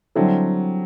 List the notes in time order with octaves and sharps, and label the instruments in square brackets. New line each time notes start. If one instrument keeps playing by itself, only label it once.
[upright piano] D3 G3 C4 E4 A4 [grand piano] F#3